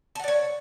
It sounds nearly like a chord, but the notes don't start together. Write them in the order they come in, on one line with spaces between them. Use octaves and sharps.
A5 F#5 D5 C#5